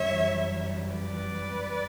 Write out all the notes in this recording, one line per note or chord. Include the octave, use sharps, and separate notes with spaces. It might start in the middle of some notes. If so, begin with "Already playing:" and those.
Already playing: F#2 E3 G3 C#5 E5
B4 D5